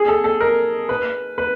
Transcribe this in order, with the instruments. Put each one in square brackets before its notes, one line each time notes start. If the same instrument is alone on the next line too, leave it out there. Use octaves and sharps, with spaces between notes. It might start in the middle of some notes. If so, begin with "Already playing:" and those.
Already playing: [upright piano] G#4
A4
A4
A#4
B4
B4